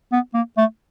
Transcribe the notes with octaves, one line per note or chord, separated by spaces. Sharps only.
B3
A#3
A3